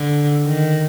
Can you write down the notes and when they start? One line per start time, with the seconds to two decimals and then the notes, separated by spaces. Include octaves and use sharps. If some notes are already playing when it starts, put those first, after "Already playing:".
Already playing: D3
0.47 D#3